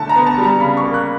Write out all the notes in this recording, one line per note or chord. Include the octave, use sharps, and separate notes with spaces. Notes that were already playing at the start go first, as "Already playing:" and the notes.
Already playing: D3 A3 A5
A#5
B3
A5
G3
A#5
C#3 B5
C#6
A#3
F#6